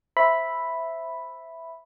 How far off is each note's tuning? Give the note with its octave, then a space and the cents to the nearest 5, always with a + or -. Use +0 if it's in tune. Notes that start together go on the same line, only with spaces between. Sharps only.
C5 +0 E5 +0 B5 +0